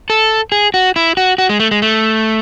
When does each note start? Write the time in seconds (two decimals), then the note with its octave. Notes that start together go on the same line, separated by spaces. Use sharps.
0.10 A4
0.52 G#4
0.74 F#4
0.96 E4
1.17 F#4
1.38 F#4
1.49 G#3
1.60 A3
1.71 G#3
1.82 A3